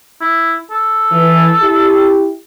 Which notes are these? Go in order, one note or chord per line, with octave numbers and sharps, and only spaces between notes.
E4
A4
E3
E4 G4